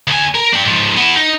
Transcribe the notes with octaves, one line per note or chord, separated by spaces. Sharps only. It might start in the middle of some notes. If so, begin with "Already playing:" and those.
D2 G#5
A#4
D4 G5
G#2 F3
B3 E4
D#4